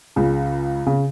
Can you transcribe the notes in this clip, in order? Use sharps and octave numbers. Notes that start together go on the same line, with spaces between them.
C#2 C#3
C#3